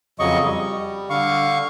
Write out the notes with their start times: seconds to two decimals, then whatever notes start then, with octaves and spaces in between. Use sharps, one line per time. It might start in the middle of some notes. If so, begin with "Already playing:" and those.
0.19 F2 C#3 F#3 D#5 C#6
0.43 G3
1.10 D3 F5 C#6